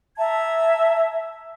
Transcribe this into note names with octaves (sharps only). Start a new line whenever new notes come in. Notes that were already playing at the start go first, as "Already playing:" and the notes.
E5 A5 A#5 G#6